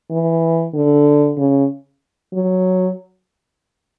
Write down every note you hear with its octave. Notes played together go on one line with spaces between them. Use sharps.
E3
D3
C#3
F#3